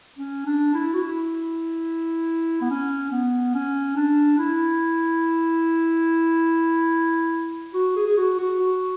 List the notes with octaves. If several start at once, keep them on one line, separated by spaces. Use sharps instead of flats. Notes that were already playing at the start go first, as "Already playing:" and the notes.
C#4
D4
E4
F#4
E4
B3
C#4
B3
C#4
D4
E4
F#4
G#4
G#4
F#4
F#4
F#4